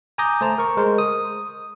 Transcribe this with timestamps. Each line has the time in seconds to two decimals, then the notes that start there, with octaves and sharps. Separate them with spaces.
0.18 G#5 A#5 D6 D#6 G6 A#6
0.41 A3 C5 A5 A#5
0.58 A#4 C#6
0.77 G#3 A#4 C5
0.98 D#6